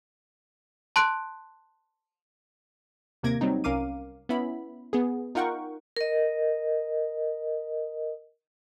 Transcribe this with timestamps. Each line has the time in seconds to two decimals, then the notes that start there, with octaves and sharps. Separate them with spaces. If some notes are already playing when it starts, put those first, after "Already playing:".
0.96 A5 C6 F#6 D7
3.23 D#2 C3 A#3 G#6 A#6 D7
3.41 F#3 G3 C4 D#4
3.64 C2 C#4 A#4 F5 D6 D#7
4.29 B3 C#4 E4 B5
4.93 B3 G#4
5.35 D#4 F4 A#4 F#5 G5 C#6
5.97 A#4 D#5